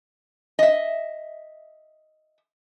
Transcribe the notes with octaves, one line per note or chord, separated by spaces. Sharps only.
D#5 E5